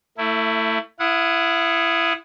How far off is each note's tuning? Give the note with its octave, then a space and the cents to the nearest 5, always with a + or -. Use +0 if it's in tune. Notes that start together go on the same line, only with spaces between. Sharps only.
A3 +30 E4 +5
E4 +20 F#5 -30 D#6 +0